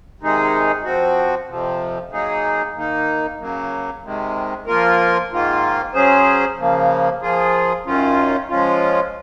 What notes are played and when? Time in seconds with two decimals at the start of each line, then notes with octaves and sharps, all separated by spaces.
0.20 C3 D#3 G#3 D#4 G#4
0.84 F3 C4 F#4
1.49 F2 C3 F3
2.11 F#3 A#3 D#4 G#4
2.75 D#3 A#3 D#4
3.39 C#3 F#3 A#3
4.03 C3 D#3 G#3
4.67 F3 A#3 F4 A#4
5.30 G#2 D#3 A#3 F4
5.94 F#3 C#4 G#4 C5
6.58 C#3 F3 A#3
7.22 F3 A#3 F4 G#4
7.85 F#2 D#3 F#3 C#4 F4
8.49 F3 G#3 C#4 F4